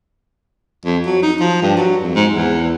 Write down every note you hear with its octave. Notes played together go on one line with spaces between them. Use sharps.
F2
F#3
D#4
F3
G2
F#3
F2
G#2
E2